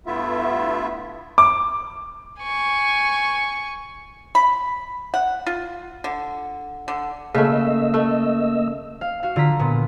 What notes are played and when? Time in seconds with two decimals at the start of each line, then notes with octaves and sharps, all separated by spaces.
0.06 G2 A3 B3 E4 F4 E5
1.38 D6
2.42 G#5 C#6
4.35 B5
5.14 F#5
5.46 F4
6.04 D3
6.88 D3
7.35 C#3 A3 A#3 D#5 E6
7.94 A3
9.01 F5
9.23 F#4 F5
9.36 D3 F4 A#5 B6
9.59 A#2 B3